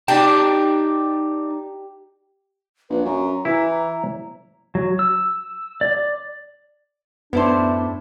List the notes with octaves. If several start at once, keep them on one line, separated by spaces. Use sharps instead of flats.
D#4 G4 D5 A5
A#1 B4
F#2 A#5
E3 E4
F#3
E6
D5
F#2 A2 B3 D4 E4 C5